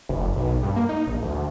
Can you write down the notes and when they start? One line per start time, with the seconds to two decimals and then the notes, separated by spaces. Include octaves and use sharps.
0.09 F#1
0.36 B1
0.63 G2
0.76 A#3
0.89 D#4
1.07 A#1
1.22 D2